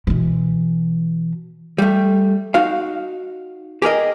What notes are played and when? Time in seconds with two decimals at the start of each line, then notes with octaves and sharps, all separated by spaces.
0.07 B2 E3
1.78 G3 A3
2.54 D#4 F#4 F5
3.82 G4 G#4 A#4 D#5